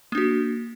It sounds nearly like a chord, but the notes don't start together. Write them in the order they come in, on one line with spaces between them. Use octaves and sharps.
A#3 D4 F#4